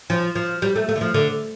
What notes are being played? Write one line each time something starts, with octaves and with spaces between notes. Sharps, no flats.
F3
F3
G3
A3
A3
D3
F3
D3